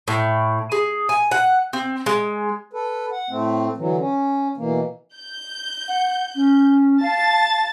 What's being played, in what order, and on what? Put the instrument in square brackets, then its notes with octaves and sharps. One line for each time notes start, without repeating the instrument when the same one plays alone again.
[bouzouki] A2
G#4
G#5
F#5
C4
G#3
[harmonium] A4 B4
F#5
A2 A3 C4
D3 E3 F#3
C#4
B2 E3 A#3
[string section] G6
[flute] F#5
C#4
[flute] F5 [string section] A5 A6